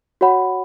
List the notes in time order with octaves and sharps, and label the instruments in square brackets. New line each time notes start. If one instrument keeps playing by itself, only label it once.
[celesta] F#4 C#5 F#5 B5